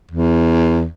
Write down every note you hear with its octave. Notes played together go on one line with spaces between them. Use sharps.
E2